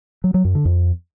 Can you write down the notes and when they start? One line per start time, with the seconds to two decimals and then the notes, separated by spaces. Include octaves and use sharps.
0.24 F#3
0.34 F#3
0.45 F#2
0.55 D3
0.65 F2